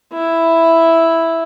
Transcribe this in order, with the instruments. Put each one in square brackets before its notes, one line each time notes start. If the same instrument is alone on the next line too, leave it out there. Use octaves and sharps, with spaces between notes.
[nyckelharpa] E4